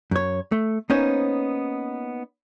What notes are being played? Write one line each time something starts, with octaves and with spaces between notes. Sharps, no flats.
F#2 C#5
A3
A#3 B3 C#4 D#4 C5 C#5